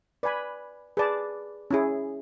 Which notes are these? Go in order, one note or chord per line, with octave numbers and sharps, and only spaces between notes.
B4 D5 G#5 B5
G#4 B4 D5 A5
C#4 E4 G#4